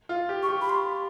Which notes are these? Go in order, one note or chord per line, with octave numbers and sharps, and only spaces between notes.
F4
G4
C#6
G4
B5
C6